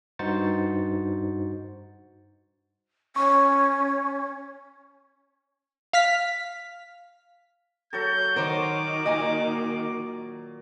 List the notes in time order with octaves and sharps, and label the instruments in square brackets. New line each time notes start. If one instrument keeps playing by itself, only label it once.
[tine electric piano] G2 D#4 F#4 C5 A6 C#7
[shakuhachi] C#4 [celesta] C#6
[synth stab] F5 F6 B6
[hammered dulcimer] F#3 F#4 A4 [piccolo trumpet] G6
[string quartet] D#3 [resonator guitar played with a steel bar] A#4 C5 C#5 [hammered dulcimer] A#5 [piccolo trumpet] D6
[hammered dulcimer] A#2 A#5 [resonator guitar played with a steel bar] D#5 G#5